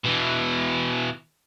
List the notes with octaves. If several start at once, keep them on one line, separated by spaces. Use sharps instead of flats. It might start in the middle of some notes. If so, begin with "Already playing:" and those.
B2 E3